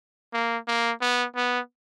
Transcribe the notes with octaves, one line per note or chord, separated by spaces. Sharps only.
A#3
A#3
B3
B3